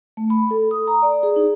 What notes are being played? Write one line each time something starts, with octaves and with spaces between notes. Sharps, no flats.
A3
B5
A4
D#6
A#5
D5
G#4
D#4